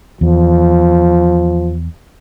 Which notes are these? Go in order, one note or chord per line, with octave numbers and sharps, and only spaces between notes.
E2 F3